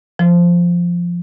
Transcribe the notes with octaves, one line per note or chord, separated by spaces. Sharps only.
F3